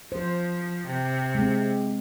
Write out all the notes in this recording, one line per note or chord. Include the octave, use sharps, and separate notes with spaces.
F3 C5
C3
G#3 C4